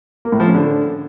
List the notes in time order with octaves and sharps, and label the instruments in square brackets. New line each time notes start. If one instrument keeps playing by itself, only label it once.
[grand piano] A#3
A2
F3
C#4
D3